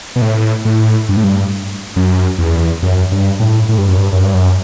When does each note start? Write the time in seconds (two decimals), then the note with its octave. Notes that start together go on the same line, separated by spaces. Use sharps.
0.16 B2
0.22 A2
0.65 A2
1.09 G2
1.17 A2
1.24 G2
1.96 F#2
2.38 E2
2.82 F#2
3.12 G2
3.40 A2
3.69 A2
3.78 G2
3.88 F#2
3.97 G2
4.13 F#2
4.23 G2
4.34 F#2